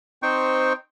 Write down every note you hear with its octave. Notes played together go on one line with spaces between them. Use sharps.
C4 D#4 C5 G5 C#6